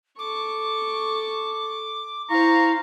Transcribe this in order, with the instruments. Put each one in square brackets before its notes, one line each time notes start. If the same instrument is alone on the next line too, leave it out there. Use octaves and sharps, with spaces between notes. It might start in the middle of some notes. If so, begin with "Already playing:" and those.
[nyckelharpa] A4 C#6 [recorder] D6
[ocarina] E4 [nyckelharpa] C5 C#6 [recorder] F5 [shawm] A#5